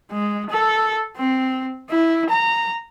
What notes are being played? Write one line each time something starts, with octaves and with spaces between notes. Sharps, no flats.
G#3
A4
C4
E4
A#5